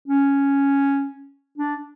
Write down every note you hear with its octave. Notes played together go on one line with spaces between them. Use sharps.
C#4
D4